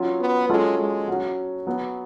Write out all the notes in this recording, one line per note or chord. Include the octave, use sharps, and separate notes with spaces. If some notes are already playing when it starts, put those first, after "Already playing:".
Already playing: F#3 C#4 F4
B3
F#3 G#3 C#4 F4 A4
G#3
F#3 C#4 F#4
F#3 B3 F#4